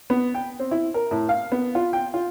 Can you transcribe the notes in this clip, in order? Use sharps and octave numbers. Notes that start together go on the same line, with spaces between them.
B3
G5
C4
E4
A#4
A2
F5
B3
F4
G5
F4